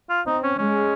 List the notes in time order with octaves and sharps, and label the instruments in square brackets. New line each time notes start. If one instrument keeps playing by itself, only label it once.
[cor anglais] F4
[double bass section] C4 [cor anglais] D#4
[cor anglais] C#4
[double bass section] G#3 [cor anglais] C#4